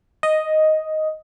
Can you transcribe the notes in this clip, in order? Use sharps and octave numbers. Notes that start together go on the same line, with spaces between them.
D#5